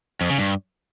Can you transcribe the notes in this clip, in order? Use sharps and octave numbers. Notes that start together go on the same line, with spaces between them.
F2
C#3
G2